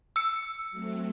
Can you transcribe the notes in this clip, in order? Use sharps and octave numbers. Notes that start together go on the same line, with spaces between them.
E6 C#7
F#3 A3 C4